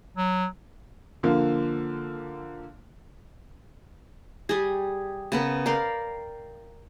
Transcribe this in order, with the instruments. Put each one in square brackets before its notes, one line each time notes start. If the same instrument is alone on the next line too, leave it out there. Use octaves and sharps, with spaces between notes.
[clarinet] F#3
[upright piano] D3 F3 A#3
[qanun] G3 G#4
C#3 B3 A#4
A#4 D5 F5 G5